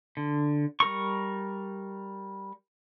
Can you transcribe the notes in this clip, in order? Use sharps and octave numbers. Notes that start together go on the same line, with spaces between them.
D3
G3 A#4 C#6